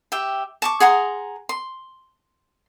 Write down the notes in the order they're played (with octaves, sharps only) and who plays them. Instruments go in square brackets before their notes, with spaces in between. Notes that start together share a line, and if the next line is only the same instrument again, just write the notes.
[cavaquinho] G4 E5 G5
A5 C#6 D6
G#4 F#5 A#5 C6
C6